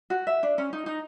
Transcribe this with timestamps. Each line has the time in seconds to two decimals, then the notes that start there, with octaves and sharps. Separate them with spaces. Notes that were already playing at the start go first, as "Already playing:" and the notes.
0.10 F#4
0.27 E5
0.43 D4
0.58 C#4
0.73 D#4
0.86 D#4